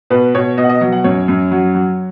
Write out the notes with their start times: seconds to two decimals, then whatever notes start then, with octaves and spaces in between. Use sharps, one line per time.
0.10 B2 B4
0.35 B2 C#5
0.57 B2 D#5
0.64 F#5
0.69 D#5
0.81 F#3
0.92 F#5
1.04 F#2 C#5
1.28 F#2
1.51 F#3
1.74 F#3